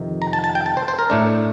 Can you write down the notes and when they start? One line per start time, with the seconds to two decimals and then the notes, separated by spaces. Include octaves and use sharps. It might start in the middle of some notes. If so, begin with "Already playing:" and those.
Already playing: F2 C3 D#3
0.22 A#5
0.33 A5
0.44 A5
0.55 G5
0.66 A5
0.77 C5
0.88 C5
0.99 A#4
1.10 A2 A3 D4